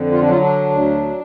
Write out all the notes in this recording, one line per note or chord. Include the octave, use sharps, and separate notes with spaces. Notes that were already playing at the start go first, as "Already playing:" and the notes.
Already playing: F2 D3
F4
D4
F#3 F4
D4
D2